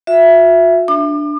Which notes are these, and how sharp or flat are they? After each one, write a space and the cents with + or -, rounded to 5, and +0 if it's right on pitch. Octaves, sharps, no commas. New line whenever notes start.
F#4 -45 E5 +10
D4 +0 D6 +40